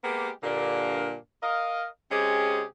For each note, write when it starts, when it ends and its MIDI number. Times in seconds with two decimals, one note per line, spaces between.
0.04 0.31 56
0.04 0.31 58
0.04 0.31 59
0.04 0.31 67
0.43 1.15 43
0.43 1.15 46
0.43 1.15 50
0.43 1.15 58
0.43 1.15 62
0.43 1.15 70
1.43 1.86 70
1.43 1.86 75
1.43 1.86 77
2.11 2.64 48
2.11 2.64 56
2.11 2.64 61
2.11 2.64 67
2.11 2.64 68